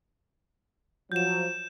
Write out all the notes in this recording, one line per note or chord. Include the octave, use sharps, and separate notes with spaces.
F3 F#3 G6 E7